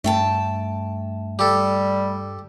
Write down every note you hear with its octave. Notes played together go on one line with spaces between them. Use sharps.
G2 A3 G5 A5
G3 G4 A4